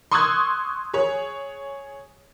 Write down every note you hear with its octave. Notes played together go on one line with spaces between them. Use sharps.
C6 C#6 D#6 E6 F#6 G#6
G#4 C#5